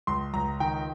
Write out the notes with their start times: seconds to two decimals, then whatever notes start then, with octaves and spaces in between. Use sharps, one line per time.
0.07 C#2 C6
0.34 C#2 A#5
0.60 D#3 G5